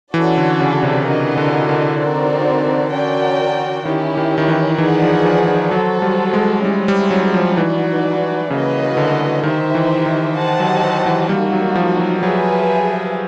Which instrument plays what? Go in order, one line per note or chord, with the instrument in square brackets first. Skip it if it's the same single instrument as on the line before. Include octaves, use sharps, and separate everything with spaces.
[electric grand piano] E3 [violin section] C#4 F#4 A4 D5
[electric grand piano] D3
C#3
C3
[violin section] D4 F#4 A#4 D#5
[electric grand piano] D3
D3
[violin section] C4 D#4 F#4 A#4 D5
C#4 F#4 A#4 D5 G5
[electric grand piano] D#3 [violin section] C#4 E4 G4
[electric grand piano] D#3
D#3
E3
[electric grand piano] E3 [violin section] D#4 G#4 B4 D5 F#5
[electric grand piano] F3
F3
F3
[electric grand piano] F#3 [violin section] F#4 A4 C5
[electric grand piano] G3
G#3
[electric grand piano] G3 [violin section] C#4 E4 G#4 C5
[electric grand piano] G3
F#3
F3
[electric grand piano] E3 [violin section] D#4 F#4 B4 D5
[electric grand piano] C#3 [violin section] A#3 C#4 F#4 B4 D#5
[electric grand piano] D3
[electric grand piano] D#3 [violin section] D#4 G4 C5 E5
[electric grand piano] E3
D#3
[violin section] G4 C5 D#5 F#5 A5
[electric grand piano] F#3
F#3
E3
[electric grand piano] G3 [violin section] A#3 D#4 F#4
[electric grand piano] F#3
F3
F#3
[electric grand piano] F#3 [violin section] G#4 B4 E5 G#5